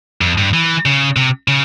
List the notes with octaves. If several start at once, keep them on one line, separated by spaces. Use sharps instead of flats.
F2
G2
E3
C#3
C3
C#3